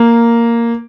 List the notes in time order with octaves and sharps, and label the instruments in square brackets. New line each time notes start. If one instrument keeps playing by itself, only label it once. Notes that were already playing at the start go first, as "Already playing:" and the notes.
Already playing: [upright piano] A#3